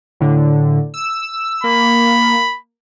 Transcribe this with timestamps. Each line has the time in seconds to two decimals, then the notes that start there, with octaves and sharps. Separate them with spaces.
0.20 A2 D3
0.94 E6
1.64 A#3 B5